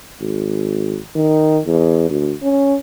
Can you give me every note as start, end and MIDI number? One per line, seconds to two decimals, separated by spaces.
0.20 0.98 32
1.15 1.60 51
1.65 2.07 40
2.10 2.33 38
2.42 2.76 61